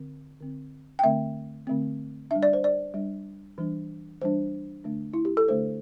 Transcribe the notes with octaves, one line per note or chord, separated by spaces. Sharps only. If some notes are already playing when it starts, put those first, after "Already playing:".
Already playing: D3 C4
D3 C4
G5
D3 A3 C4 E5
D3 A3 C4
G3 D4 E5
D5
C5
D5
G3 D4
E3 G3 D4
E3 G3 D4 C5
D3 A3 D4
E4
G4
A4
D3 A3 D4 C5